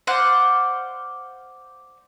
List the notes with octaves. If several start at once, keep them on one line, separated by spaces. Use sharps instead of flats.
C5 D5 F5 F#5